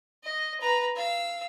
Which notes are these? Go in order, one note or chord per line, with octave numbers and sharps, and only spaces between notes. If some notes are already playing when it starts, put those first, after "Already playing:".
D#5
B4 A#5
F5 E6